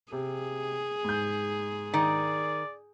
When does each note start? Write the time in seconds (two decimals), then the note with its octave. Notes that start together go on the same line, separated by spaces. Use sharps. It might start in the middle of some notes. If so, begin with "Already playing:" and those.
0.12 C3 G#4
1.04 G#2 G6
1.94 D#3 D5